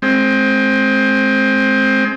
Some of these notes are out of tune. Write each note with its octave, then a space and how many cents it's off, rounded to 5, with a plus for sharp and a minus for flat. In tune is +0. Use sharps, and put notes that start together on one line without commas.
G#3 +25 C4 +15